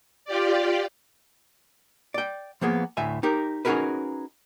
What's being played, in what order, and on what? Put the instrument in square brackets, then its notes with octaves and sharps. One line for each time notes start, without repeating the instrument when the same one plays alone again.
[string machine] F4 G4 D5
[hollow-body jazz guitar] D5 G5
F3 A#3 B3 G#4
D2 A2 E5 G#5
D#4 G4 A#4
C#4 D#4 F#4 G#4 A#4 B4